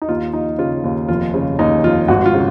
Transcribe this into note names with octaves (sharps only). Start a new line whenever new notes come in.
D#4
D#2 F4
F3 D#4
C#3 F4
D#2
F1 F4
C#3
D#2 D#4
F1 F4
G#1 F#4
F4
C#3